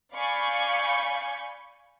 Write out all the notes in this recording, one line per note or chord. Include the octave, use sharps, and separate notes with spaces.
D5 F5 G#5 B5 C#6 G6